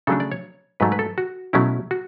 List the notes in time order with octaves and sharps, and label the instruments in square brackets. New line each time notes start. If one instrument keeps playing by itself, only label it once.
[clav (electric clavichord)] C#3 F#3 A3 D4 A4
D5
C#5
G#2 F#3 A3 B4
B4
A4
F#4
B2 F#3 A3 C#4 E4
F#4